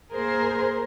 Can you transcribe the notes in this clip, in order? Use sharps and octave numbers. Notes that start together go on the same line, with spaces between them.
A#3 G#4 A#4 C5